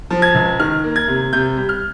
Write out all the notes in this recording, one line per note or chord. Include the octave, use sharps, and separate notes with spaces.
F3
G#6
C#2
D#3 F6
A#3
G#6
C3
C3 G6
G3
F6